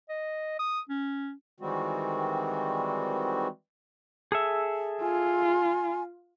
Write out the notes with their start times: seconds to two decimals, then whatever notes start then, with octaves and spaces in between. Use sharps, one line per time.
0.09 D#5
0.59 D#6
0.89 C#4
1.60 D#3 E3 G3 G#3 C4 F#4
4.32 G#4 A4 E5
5.02 F4 G#5